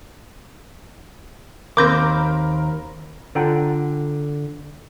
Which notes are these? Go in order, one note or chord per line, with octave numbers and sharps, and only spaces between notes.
D#2 C4 A#4 B5 C6 D6 G6 A#6
D3 F4 A4 F#5 G5 A#5